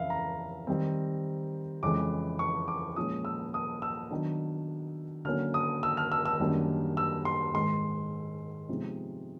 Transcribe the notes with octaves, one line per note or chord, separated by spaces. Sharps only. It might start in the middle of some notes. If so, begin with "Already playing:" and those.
Already playing: F2 C#3 E3 E5 F5
A#5
D#3 G3 C4
F2 C#3 E3 G#3 D6
C#6
D6
A#2 F3 G#3 C#4 D#6
E6
D#6
E6
D#3 F#3 B3 D4
D3 F#3 A#3 C#4 F6
D#6
E6
F6
E6
E6
F#2 D#3 G3 A#3 D4
E6
C6
G#2 D#3 G#3 C6
C3 F3 G#3 B3 D#4